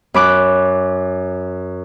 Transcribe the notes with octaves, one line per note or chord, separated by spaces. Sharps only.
F#2 B5 D6 F#6